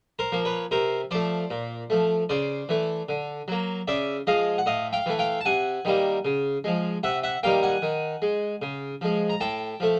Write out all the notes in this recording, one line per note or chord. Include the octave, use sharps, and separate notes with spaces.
A#4 C5
F3 A#3
B4 C#5
C3 A#4 C5
F3 A3 C5 D5
A#2
F3 A3
C#3 C5 D5
E3 A3
D3
F#3 A#3
C#3 D5 E5
F3 G#3 D#5 F5
F#5
A2 D#5 F5
F5 G5
E3 A3
F5 G5
A5
C3 F#5 G#5
D#3 G3 A#3
C#3
F3 G#3
C3 E5 F#5
E5 F#5
D#3 G3 A#3 F5 G5
F#5 G#5
D#3
G#3
C#3
F3 G#3
A#5
A2 G5 A5
F3 A3